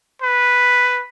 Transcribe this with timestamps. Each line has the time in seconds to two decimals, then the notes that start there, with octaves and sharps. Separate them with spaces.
0.22 B4